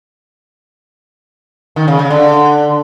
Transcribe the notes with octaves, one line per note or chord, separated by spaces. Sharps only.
D#3
C#3
C#3
D3